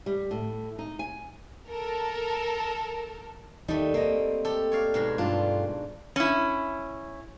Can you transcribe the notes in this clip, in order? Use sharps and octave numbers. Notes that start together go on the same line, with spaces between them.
G3
A2
D#4
G#5
A4 A#4
D#2 G3 A3 D#4
A#3 C4 D#5
G4 A4
C#5 D5 F5
G#2 B2 G#3
G2 A3 D4 F4
C#4 E4